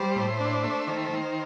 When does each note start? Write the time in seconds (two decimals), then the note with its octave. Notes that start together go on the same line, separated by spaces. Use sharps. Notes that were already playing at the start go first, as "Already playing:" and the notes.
Already playing: G3 C5
0.16 A2
0.40 D4
0.64 A3
0.87 D#3
1.11 D#3